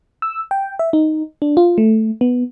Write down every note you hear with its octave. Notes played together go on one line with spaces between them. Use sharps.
E6
G5
E5
D#4
D4
F4
A3
B3